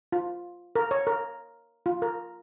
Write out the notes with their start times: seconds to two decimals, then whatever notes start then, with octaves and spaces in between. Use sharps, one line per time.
0.12 F4
0.76 A#4
0.91 C#5
1.07 A#4
1.86 F4
2.02 A#4